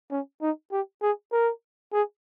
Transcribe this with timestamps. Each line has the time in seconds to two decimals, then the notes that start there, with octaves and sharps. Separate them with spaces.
0.11 C#4
0.41 D#4
0.72 G4
1.02 G#4
1.32 A#4
1.93 G#4